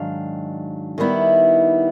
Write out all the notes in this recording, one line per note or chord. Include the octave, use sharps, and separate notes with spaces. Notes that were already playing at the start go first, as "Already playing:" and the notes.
Already playing: G#2 D#3 F#3 D4 F5
D#3 G3 B3 E4